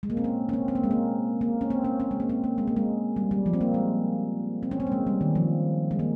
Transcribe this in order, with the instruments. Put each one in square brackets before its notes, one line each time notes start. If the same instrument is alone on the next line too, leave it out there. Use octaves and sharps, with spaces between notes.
[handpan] G#3
A#3
C4
C#4
C#4
C4
C4
A#3
G#3
A#3
A#3
C#4
C4
C#4
C#4
G#3
A#3
C4
A#3
G#3
A#3
G#3
G3
G3
F3
C4
A#3
G#3
C4
C#4
C4
A#3
G#3
G3
D#3
F3
G#3
A#3